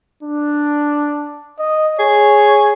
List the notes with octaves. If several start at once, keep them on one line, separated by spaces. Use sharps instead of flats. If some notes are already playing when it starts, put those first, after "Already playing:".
D4
D#5
G#4 C#5